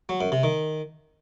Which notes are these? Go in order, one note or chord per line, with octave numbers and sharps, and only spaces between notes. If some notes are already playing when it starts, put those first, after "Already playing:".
F#3
F#2
C3
D#3